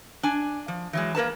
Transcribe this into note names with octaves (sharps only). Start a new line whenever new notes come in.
D4 G#5
F3
E3 F#3 G#3
A#3 A#4 B4 A5